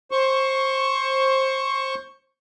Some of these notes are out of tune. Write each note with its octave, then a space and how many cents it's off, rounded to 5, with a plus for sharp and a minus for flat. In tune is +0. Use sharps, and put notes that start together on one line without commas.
C5 +20 C#6 +0